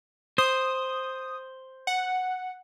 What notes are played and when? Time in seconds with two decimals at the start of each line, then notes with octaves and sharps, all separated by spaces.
0.38 C5 D#6
1.87 F#5